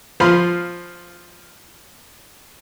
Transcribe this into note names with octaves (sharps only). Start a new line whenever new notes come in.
F3 F4 F5 B5 C6